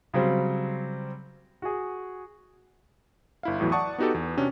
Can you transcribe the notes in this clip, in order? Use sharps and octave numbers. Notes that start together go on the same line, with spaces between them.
C#3 F#3 G3 C4
F#4 G#4
G1 E4 F5
E2 A2 E3 F#3
D5 F#5 A5 C#6 D#6
B3 D#4 F#4 G4 A4
E2
C3 C#4 D4 F#4